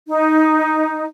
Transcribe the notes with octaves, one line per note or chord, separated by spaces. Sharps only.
D#4